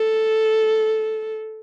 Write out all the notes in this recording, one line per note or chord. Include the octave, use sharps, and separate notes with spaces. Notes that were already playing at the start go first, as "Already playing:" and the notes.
Already playing: A4